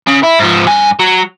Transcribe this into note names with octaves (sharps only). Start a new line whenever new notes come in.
C#3
E4
G#2 F3
G2 G#5
F#3